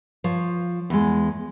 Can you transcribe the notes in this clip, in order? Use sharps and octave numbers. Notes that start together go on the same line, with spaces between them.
F3 C#5
E2 G#3